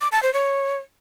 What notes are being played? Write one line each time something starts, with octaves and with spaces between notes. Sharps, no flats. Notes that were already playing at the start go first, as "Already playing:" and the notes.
D6
A5
C5
C#5